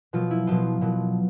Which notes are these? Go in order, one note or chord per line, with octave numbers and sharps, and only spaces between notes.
B2 F3 F#3 F4
E4
B2 F3 F#3 F4
B2 F#3